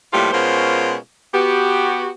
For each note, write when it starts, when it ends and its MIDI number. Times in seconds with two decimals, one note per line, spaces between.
0.13 0.30 45
0.13 0.30 53
0.13 0.30 55
0.13 0.30 57
0.13 0.30 58
0.13 0.30 65
0.33 0.96 47
0.33 0.96 56
0.33 0.96 61
0.33 0.96 65
0.33 0.96 70
0.33 0.96 72
1.33 2.09 59
1.33 2.09 66
1.33 2.09 67